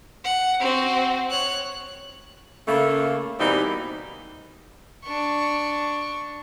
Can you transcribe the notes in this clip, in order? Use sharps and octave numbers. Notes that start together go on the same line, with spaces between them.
F#5
C4 F#4
C#5 F#6
C#3 A3 A#3
B2 E3 G3 A#3 C4 D#4
D4 C#6